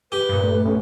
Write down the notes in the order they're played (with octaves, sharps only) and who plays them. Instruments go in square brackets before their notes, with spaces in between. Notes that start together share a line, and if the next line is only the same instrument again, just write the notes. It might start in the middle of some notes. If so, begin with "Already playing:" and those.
[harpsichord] G4 [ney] B4
[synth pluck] G2 A#2
[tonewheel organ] A3
[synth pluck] B1 [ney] C#4